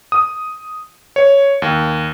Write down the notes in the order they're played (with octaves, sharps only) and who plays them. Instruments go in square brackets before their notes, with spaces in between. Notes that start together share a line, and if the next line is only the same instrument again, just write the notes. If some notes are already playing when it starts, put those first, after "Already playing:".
[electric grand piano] D#6
C#5
D#2